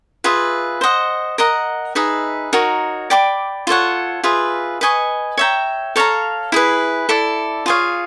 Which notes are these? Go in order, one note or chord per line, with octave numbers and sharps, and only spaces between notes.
F4 G#4 B4 E5
C5 D#5 F#5
A#4 D#5 F#5 A#5
D#4 G#4 B4 E5
D#4 F#4 A#4 C#5
D5 G5 B5 D6
F4 A4 C#5 F#5
F4 G#4 B4 E5
B4 D#5 G#5 C#6
C#5 E5 G5 A#5
A4 C#5 F5 A#5
E4 G#4 B4
E4 A4 D5
F4 G#4 C#5 F5